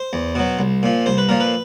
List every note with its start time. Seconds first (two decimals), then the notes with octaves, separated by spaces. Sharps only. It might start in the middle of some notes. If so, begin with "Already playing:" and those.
Already playing: C5
0.13 E2
0.35 B2 F#3
0.59 C2
0.83 A#2 F3
1.06 C2 C5
1.18 B4
1.29 A#2 F3 A#4
1.40 B4